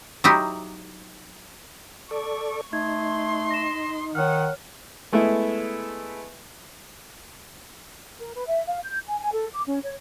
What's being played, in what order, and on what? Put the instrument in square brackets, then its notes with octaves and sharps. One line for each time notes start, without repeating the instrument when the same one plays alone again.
[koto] F#3 D#4 E4 G4
[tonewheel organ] A4 D5 [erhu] C#6
[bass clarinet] A3 [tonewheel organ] D#4 [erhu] C6 [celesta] G#6
[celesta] A#6 E7
[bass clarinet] D#3 [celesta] C#5 F6 [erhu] F#5
[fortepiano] G#3 A3 B3 E4 E5
[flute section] A#4
B4
E5
F5
G6
G#5
G#5
A4
D6
C#4
C#5